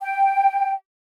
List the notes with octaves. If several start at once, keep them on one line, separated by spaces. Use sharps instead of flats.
G5